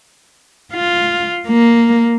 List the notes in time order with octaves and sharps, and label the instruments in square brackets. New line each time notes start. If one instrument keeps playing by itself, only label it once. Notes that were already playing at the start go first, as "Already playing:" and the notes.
[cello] F4
A#3